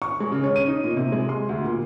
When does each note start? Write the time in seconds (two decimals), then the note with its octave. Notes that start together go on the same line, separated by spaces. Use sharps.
0.02 C#6
0.20 G#3
0.32 C#3
0.44 C#5
0.56 D#7
0.67 D#4
0.84 A#2
0.97 C3
1.12 G#3
1.29 C6
1.49 D2
1.64 A#2